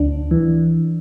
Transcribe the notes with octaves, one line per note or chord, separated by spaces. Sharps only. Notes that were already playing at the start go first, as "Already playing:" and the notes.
Already playing: D2 D4
E3